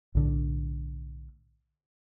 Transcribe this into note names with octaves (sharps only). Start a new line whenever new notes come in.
B1 A2 D3